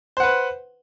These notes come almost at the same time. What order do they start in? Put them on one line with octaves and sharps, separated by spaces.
C5 F#5 B4